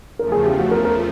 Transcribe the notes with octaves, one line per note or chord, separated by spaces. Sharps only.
E2 C#3 F3 A3 A#4
G#4
G4
F#4
A#4
A#4